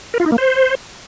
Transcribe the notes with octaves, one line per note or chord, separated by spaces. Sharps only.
A#4
F4
D#4
A#3
C5